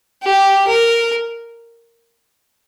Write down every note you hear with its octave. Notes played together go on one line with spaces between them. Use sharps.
G4
A#4